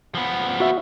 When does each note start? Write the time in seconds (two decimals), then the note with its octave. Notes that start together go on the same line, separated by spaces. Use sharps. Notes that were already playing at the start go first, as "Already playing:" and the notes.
0.15 F3 B3
0.60 F#4 E5